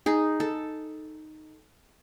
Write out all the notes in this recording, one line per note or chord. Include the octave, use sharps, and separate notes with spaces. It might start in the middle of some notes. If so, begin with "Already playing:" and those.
D#4 G#4
A4